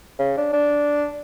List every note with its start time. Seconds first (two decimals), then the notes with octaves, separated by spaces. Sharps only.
0.19 C#3
0.37 D4
0.53 D4